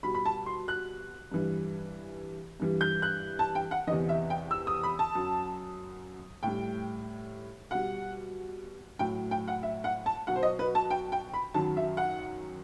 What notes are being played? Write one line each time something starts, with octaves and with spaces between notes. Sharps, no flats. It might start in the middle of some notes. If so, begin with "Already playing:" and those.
B2 G3 B5
B5
A5
C6
F#6
G2 E3 G3
G2 E3 G3
G6
F#6
A5
G5
F#5
E2 C3 E3 D#5
E5
G5
E6
D#6
B5
A5
F#2 F#3
A2 G3 G5
B2 G3 F#5
A2 F#3 G5
G5
F#5
E5
F#5
A5
B2 F#3 F#5
C5
D#5
B4
A5
G5
G5
B5
F#2 D#3 F#3 A5
E5
F#5